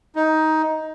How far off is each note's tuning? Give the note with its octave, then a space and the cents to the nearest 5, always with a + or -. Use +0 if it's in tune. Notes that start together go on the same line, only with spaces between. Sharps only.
D#4 +15